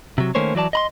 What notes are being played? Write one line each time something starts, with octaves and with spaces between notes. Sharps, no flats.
C3 F#3
D#3 A3 A#3 C#4 C5 C#5
E3 F#3 D5 A5
D#5 B5 C6